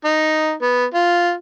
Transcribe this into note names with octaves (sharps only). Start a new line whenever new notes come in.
D#4
B3
F4